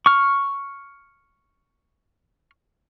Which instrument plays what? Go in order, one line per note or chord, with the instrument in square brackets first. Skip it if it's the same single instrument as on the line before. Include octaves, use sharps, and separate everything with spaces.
[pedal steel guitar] C#6 F6